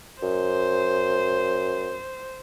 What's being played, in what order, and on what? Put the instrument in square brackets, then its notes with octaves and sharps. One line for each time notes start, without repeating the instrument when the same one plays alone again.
[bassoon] F#2 [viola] C5